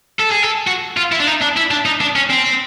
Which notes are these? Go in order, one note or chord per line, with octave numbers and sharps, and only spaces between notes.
A4
G#4
A4
F#4
F4
E4
D4
D#4
D4
E4
D4
D#4
D4
C#4
C4